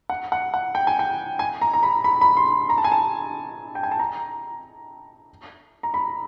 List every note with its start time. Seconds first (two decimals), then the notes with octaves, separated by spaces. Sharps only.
0.10 F#5
0.32 F#5
0.54 F#5
0.75 G5
0.87 G#5
0.99 G5
1.39 G#5
1.61 A#5
1.73 A#5
1.83 B5
2.04 B5
2.21 B5
2.37 C6
2.69 A#5
2.78 A5
2.84 G#5
2.92 A5
3.75 G5
3.83 G#5
3.91 A5
3.99 A#5
5.83 A#5
5.94 B5